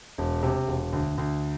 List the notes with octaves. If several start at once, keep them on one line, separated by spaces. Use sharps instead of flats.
E1
C3
E1
D2
D2